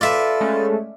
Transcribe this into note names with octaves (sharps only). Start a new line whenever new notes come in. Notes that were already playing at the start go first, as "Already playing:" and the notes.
F4 A4 B4 D5 E5
G#3 A3 C#4